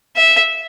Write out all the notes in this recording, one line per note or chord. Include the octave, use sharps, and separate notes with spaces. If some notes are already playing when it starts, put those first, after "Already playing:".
E5